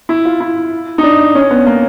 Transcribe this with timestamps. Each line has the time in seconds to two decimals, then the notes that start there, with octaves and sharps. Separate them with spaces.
0.09 E4
0.25 F4
0.40 E4
0.98 D#4
1.03 D4
1.35 C#4
1.51 B3
1.66 A#3